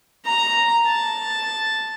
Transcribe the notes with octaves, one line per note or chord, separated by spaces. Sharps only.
A#5
A5